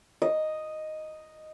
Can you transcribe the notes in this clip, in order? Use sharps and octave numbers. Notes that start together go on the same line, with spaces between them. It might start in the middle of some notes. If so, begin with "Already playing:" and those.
D#5